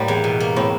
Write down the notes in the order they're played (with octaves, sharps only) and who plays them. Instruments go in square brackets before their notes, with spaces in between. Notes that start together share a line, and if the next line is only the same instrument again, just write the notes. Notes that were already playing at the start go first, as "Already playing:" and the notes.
Already playing: [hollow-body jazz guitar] A2 [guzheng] G3 A#3
[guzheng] E2
B2
A#3
[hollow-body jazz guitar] A2 [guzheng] C4